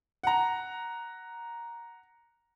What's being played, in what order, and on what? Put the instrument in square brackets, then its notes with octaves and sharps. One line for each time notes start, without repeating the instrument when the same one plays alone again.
[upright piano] F#5 A#5